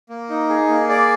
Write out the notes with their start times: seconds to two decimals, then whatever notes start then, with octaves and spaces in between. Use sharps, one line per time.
0.09 A#3
0.29 D#4
0.49 G#4
0.69 A#3
0.89 G#4 D5